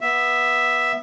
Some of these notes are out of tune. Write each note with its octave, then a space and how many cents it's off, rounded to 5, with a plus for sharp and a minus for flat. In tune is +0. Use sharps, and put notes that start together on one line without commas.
B3 -15 E5 +0